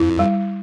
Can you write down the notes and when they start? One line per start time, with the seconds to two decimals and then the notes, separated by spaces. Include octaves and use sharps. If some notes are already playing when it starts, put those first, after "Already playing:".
Already playing: F2 E4
0.19 G3